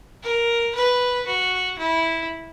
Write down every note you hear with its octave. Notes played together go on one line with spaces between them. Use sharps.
A#4
B4
F#4
E4